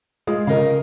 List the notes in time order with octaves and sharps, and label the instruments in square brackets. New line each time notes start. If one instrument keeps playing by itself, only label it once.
[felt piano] G#3 F4 G#4
[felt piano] C#3 [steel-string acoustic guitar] A#4 D#5 F5